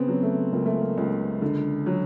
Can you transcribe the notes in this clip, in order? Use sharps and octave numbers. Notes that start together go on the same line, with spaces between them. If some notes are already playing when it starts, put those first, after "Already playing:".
Already playing: C#3 B3 C4
F#3
A3
C#2 A#3
A3
A#3
C#2
D3
F#3